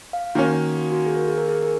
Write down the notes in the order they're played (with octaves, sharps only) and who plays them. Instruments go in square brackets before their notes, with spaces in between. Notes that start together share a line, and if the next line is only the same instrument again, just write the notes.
[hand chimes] F5
[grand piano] D#3 A#3 C#4 [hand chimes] F#4
[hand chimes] F#4
F#4
G#4
A#4
G#4
A#4
G#4
A#4